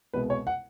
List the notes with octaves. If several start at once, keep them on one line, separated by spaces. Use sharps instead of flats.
C2 B2 G#3 B3 B4
C#5
F#5